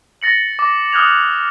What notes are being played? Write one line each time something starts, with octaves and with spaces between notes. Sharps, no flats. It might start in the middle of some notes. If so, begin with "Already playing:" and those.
A6 A#6 C#7 F#7
D6 A#6
D#6 F6 F#6 G#6 F7